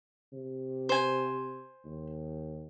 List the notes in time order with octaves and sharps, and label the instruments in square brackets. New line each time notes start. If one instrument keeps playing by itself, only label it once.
[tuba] C3
[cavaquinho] C5 G#5
[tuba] D#2